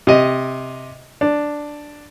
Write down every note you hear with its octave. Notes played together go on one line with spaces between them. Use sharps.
C3 D#5
D4